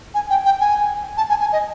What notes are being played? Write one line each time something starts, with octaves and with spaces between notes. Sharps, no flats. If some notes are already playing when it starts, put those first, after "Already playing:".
G#5
G5
G5
G#5
A5
G#5
G#5
D#5